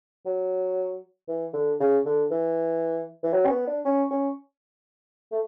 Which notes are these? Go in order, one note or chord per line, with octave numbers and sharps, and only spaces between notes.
F#3
E3
D3
C#3
D3
E3
E3
F#3
C#4
B3
D4
C#4
C#4
A3